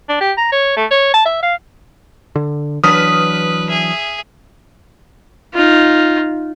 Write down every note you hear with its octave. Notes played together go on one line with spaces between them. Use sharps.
D4
G4
A#5
C#5
A3
C#5
A5
E5
F5
D3
E3 F#3 D4 B4 D#6 F6 B6
G#4 E5
D#4 F4